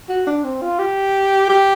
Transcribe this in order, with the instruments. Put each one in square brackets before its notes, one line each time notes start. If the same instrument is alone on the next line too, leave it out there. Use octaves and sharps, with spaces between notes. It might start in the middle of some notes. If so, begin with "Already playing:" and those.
[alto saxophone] F#4
D4
C4
F4
G4
G4